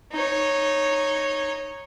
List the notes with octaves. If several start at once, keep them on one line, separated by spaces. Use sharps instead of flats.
D#4 C#5